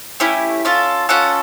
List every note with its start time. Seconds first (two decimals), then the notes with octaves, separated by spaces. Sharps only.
0.20 A3 C#4 E4 G4
0.65 C#4 F4 A4
1.09 C#4 F4 A4 F#5